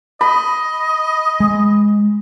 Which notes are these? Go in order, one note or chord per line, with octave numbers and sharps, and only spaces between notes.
D#5 B5
G#3